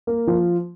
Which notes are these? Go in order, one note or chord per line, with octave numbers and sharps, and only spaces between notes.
A#3
F3